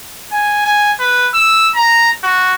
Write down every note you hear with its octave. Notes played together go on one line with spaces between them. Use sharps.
G#5
G#5
B4
E6
A#5
F#4